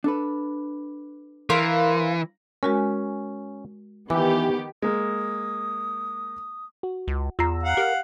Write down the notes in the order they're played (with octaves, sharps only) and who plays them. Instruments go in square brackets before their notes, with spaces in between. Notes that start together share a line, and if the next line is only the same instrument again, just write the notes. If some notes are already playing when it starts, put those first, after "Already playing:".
[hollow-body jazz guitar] D4 A4 B4
[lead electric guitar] E3 [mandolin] A#4 C5 F5
[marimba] G#3 F#4 A#4 [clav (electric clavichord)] C#4
[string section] D#3 B3 G4 [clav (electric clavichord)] E3 [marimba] D6
[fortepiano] G#3 A#3 [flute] D#6
[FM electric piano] F#4
[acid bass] C#2
[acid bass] E2 [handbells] F4 A#6 C7 [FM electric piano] A#5 E6
[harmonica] F5 F#5
[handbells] G4 [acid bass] A#4